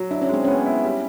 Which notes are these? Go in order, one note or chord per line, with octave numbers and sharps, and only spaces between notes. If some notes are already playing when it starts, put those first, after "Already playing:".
Already playing: F#3
D4 E4
C#4
G#3 C4
B3 C#4
E4
G3